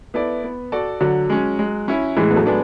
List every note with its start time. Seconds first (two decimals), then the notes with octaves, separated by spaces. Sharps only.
0.14 B3 E4 A4 D5
0.44 B3
0.72 F#4 A4 D5
1.00 D3 F#3
1.30 G#3 C#4
1.59 G#3
1.88 C#4 E4
2.16 A2 E3 G#3
2.31 B3
2.36 F#3 A3
2.46 G#3 B3 D4